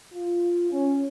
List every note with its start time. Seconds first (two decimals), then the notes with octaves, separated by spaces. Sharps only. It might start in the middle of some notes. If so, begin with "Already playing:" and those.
0.13 F4
0.71 C#4